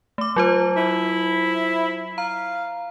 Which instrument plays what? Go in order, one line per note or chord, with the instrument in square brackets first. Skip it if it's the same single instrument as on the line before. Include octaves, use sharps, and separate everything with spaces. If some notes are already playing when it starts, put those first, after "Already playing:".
[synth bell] A3 D6
F#3 F4 C5
[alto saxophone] E4
[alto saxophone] F5 [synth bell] A#5